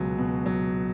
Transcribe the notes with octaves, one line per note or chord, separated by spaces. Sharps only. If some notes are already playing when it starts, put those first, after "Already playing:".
Already playing: C#2 B2 F#3 G#5
B2
F#3